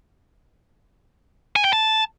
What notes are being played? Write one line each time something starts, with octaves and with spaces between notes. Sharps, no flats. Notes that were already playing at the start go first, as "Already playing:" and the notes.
G#5
G5
A5